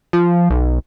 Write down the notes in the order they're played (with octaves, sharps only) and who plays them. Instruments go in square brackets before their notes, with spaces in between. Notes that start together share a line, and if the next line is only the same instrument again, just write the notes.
[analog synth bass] F3
B1